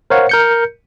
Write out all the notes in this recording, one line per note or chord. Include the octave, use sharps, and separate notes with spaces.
A#4 C5 C#5 F5 F#5
A#4 G6 C#7